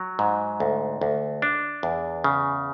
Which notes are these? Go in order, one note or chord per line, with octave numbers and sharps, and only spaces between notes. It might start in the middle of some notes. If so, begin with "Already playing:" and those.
Already playing: F#3
G#2
D2
D2
D4
E2
C#3